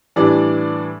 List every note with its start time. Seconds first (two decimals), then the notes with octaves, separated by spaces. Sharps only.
0.16 A2 E3 G3 D4 D5